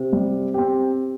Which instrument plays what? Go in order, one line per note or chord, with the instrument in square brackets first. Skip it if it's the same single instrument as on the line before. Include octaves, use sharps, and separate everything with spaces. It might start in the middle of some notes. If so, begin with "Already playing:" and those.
Already playing: [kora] C3
[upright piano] G3
C4 G4